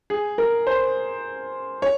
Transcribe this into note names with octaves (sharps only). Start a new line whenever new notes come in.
G#4
A#4
C5
C#5